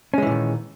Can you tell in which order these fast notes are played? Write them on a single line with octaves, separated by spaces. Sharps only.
C#4 G#3 E3 A#2 D#3